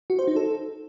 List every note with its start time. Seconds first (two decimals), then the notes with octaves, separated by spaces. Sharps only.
0.10 F#4
0.19 C5
0.27 D#4
0.36 A4